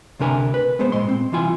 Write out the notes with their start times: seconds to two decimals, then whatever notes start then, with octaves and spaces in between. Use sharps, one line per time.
0.19 D2 C3 D4 A#4 G#5 B5
0.54 B4
0.79 G#3 B3 C5
0.92 A#2 G#3 C6
1.09 C4
1.32 C2 E3 E4 F4 G#5